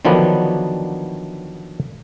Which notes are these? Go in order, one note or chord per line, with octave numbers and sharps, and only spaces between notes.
D3 D#3 F3 F#3 B3 D4